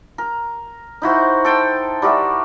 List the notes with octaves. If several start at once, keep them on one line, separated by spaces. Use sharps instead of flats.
A#4
D#4 E4 F#4 C5
A4 G5 C6
G3 F#4 A#4 E5